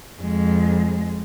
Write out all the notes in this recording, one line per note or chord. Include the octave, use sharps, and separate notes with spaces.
F2 G#3